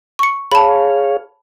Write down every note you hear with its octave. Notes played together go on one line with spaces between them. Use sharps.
C#6 C#7
G#4 C#5 F5 A5 B5